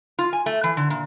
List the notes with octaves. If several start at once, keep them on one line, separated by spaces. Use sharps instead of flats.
F4
G#5
A3
E3
D3
A#2